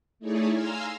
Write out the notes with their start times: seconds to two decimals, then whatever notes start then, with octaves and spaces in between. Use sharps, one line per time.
0.19 A3 D#4 E4 G#4 C#5 D5
0.51 F5 G#5 A#5 C6 E6 F6